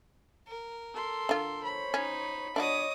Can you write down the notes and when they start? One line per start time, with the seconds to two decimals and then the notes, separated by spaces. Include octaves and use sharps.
0.47 A#4
0.94 A4 C6
1.29 D3 F4
1.63 C5 C#5 B5
1.94 C#4 D#4
2.56 D4 E4 F#4 C#5 D#5 D6 D#6